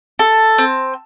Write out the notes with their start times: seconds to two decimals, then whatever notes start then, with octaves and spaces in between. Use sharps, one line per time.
0.19 A4
0.58 C4